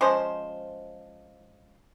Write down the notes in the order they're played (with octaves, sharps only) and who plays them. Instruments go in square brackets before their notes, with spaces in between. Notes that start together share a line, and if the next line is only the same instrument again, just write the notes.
[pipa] F3 G#3 C#4 C5